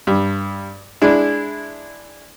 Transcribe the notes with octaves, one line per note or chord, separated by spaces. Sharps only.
G2
G#3 D4 E4